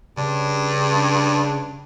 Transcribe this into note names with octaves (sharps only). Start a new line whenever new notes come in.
G2 C#3 D4